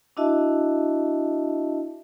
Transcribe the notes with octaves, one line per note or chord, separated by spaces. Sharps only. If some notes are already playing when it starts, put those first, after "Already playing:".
D4 E4 F#4 D#5 E5 A5